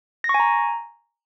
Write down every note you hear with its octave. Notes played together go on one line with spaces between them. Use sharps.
A#6
C#6
G#5
A#5